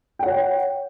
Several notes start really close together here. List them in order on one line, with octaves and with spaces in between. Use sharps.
G5 F#5 C#5